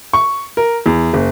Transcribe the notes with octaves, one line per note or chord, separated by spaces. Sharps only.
C#6
A#4
E2
F#1